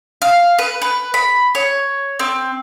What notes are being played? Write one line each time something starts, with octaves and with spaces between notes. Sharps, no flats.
F5
B4
B4
B5
C#5
C4